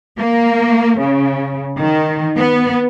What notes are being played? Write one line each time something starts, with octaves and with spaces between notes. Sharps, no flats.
A#3
C#3
D#3
B3